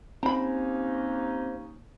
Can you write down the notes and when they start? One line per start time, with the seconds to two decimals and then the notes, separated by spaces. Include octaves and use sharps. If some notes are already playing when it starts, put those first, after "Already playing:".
0.23 D#2 C4 C#4 D#4 C5 A#5 B5